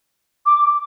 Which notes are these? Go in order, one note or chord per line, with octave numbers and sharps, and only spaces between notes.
D6